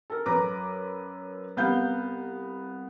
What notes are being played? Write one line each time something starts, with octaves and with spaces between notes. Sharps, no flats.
A4 A#4
F#2 B4 A#5 D6
C2 B3 F5 G6